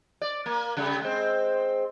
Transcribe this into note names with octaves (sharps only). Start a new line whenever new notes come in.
D5
A#3
C#3 G3 A3
G#3 C4